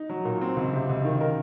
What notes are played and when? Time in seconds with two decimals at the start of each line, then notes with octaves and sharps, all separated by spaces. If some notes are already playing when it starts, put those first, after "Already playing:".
Already playing: D#4
0.09 F#3
0.25 A#2
0.41 C4
0.56 C#2
0.73 C3
0.89 C#2
1.05 D#3
1.20 A#4